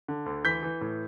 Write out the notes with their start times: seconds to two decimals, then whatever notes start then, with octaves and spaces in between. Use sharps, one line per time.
0.08 D3
0.26 D2
0.44 E3 G6 B6
0.63 E3
0.81 A2